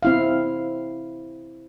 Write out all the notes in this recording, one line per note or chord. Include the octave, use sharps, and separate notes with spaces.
C4 E4 F5